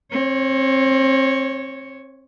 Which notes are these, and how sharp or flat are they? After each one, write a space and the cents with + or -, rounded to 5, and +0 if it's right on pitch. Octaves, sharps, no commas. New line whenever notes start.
C4 +30 C#5 +0